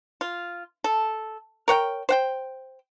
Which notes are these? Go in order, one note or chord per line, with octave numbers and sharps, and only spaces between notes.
F4
A4
A#4 C#5 F#5 G5
C5 F#5 G5